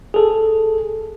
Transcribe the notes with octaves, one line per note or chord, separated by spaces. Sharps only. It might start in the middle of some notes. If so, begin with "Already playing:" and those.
G#4 A4